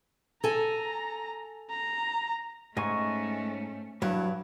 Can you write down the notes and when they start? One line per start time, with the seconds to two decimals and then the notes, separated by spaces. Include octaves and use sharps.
0.44 A4 G#5 A#5
1.70 A#5
2.77 G#2 A3 C#4 D#5 G#5 C#6
4.02 G2 F#3 G3 E4